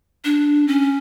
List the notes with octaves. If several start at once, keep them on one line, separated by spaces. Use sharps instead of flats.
D4
C#4